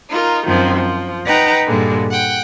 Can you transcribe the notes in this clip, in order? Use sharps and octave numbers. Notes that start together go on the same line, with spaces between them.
D#4 F4 A#4
F#2 D#3 F3 C4
F3
D#4 B4 F#5 G5 A#5
G2 A#2 D3 G3 G#3
F#5 G5